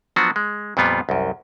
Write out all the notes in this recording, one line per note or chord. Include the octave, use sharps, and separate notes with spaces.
F3 F#3 B3 D4 F#4
G#3
F2 A#2 G3 B3 F4
C2 F#2